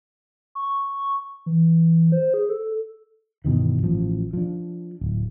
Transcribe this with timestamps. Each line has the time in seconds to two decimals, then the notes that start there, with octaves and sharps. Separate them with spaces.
0.55 C#6
1.46 E3
2.12 C5
2.34 G#4
2.49 A4
3.45 G2 B2 D#3 E3
3.82 A1 F3
4.33 F3 D4
5.01 D1